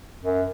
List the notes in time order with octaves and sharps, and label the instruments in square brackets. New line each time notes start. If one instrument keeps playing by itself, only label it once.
[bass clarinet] F#2